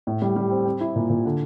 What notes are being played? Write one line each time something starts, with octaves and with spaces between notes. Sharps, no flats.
A2
G3
G3
C4
C4
E4
A#2
A#2
D3